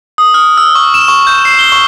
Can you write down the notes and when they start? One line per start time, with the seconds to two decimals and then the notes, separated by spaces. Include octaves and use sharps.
0.18 D#6
0.34 F6
0.58 E6
0.75 C#6
0.94 E7
1.08 C#6
1.27 G6
1.45 C7
1.59 G7
1.72 C#6